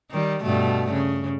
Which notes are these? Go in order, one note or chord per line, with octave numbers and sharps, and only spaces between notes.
D#3 G3
G2 B2 A3
C#3